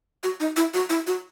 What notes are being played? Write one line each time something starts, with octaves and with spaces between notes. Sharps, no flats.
F#4
D#4
E4
F#4
E4
F#4